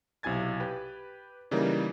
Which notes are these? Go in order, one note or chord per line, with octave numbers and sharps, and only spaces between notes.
B1 C3 E4 G#5 G#6 A6
G4 B4
C#3 E3 G3 A#3 D#4 A#4